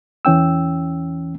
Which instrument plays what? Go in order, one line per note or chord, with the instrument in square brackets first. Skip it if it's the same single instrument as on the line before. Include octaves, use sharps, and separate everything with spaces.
[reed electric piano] E2 E3 C#4 G5 E6